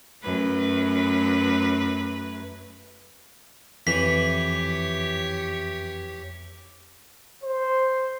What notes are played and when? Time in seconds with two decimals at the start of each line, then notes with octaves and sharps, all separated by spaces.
0.23 F#2 A3 B4
3.87 F2 E3 G4 C#5 B6
7.44 C5